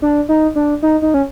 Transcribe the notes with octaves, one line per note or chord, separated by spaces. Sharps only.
D4
D#4
D4
D#4
D#4
C#4